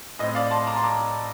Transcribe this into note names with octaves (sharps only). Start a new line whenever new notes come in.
A2 A3 C4 D#5
D5 F5
A5 C6
A#5 D6
C6
A#5 D6